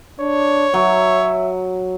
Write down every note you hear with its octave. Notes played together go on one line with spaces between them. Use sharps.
D4 C#5
F#3 E5